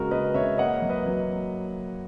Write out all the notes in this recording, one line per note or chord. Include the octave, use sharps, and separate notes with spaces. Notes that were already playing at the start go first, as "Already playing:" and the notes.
Already playing: C#3 G#3 F#4 A#4
G#3 B4 D#5
C#3 C#5 E5
A#3 D#5 F#5
F#3
B4 D#5
F#3